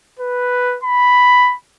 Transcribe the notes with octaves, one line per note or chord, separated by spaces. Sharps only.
B4
B5